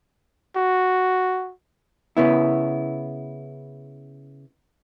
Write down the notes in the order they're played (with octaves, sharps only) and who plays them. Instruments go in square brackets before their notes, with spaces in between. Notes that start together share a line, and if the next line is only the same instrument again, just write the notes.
[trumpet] F#4
[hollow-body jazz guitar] C#3 B3 E4